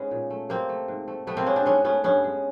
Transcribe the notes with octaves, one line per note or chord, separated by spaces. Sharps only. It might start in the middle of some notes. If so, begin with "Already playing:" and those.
Already playing: G#2 G#3 B3 C#4
A#2
A3
C3 A#3 C4
A3
G#2
A3
C3 A3 B3
A#3 C4
G#3 B3 C#4
C4 D4
G#2 B3 C#4
A3 B3 C#4
G2 B3 C#4
G#3